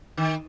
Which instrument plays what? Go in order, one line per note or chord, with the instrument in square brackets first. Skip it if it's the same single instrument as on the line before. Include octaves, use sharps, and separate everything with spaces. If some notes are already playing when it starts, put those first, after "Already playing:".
[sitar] D#3